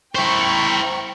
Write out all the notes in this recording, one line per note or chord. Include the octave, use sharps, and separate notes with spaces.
E4 C5 G5 A#5 C#6